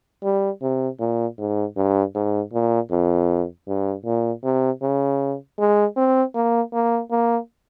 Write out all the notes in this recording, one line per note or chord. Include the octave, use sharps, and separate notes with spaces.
G3
C3
A#2
G#2
G2
G#2
A#2
F2
G2
A#2
C3
C#3
G#3
C4
A#3
A#3
A#3